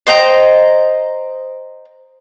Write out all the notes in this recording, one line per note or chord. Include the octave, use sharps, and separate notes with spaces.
C5 D#5 G5 A#5